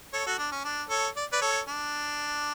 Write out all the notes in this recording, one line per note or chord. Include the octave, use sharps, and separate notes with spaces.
A4 C#5
F#4 A4
D4
C#4
D4
A4 C#5
D5
B4 D5
A4 C#5
D4